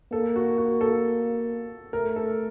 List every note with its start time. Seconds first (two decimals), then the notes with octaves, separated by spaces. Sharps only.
0.13 A#3 A4
0.36 F#4
0.58 F#4
0.81 A4
1.93 A3 A#4
2.16 A4